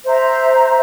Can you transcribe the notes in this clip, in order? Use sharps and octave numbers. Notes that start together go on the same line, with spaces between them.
C5 E5 A#5